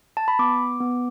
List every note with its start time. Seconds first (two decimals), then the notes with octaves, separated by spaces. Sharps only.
0.17 A5
0.28 B5
0.39 B3 D6
0.80 B3